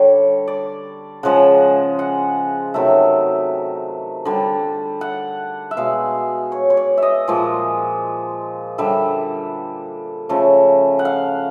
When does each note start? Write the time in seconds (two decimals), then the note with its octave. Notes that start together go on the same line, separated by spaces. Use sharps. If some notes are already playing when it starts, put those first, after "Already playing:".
Already playing: D3 G3 C#5
0.47 D5
1.23 C#3 F3 G#3 F#5
1.99 F#5
2.74 C3 D#3 F#3 A3 E5
4.25 D3 G3
5.01 F#5
5.71 E5
5.77 B2 G#3 F5
6.52 C#5
6.70 C#5
6.77 D5
6.97 E5
7.02 D#5
7.28 A#2 F3 G#3
8.78 D3 G3 E5
10.29 C#3 F3 A3
10.99 F#5
11.05 F5